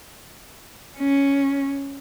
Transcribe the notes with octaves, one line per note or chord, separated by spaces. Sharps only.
C#4